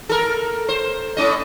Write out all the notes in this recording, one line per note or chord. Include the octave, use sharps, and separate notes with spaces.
A4 A#4
C5
A2 C#4 D#5